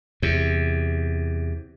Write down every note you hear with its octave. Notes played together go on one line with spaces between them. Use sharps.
E2 C3